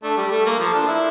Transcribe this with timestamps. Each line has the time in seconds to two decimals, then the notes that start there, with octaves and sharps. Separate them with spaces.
0.03 A3 D4
0.17 G3 G4
0.31 A3 A4
0.46 A#3 A#4
0.59 F3
0.67 A4
0.73 D4
0.87 E4 F4